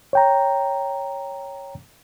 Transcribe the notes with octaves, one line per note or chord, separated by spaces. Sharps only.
C#5 G5 A#5